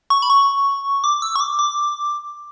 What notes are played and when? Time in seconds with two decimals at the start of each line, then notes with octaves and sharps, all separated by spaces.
0.10 C#6
0.22 B5
0.30 C#6
1.04 D6
1.22 E6
1.36 C#6
1.40 D6
1.59 D6